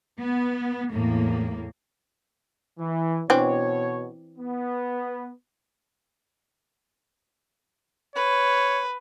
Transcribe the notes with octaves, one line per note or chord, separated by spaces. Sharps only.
B3
E2 A2 A#3
E3
B2 E3 C4 D4 C#5
B3
B4 C#5